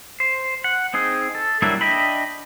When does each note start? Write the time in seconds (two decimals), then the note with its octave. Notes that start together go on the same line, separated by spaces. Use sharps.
0.20 C5
0.64 F#5
0.94 C4 D#4 G#4
1.35 A4
1.62 F#3 G3 A#3 D4 E4
1.81 D4 D#5 E5 G5 B5